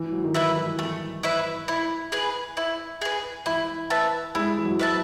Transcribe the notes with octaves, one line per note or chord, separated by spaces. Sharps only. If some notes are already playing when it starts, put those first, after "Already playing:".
Already playing: E3
F#3
D#3
E3 E4 B4 E5
E3
E3 A3
E4 B4 E5
E4
G#4 B4
E4
G#4 B4
E3 E4
B4 E5 A5
G#3 E4
E3
F#3
B4 E5 A5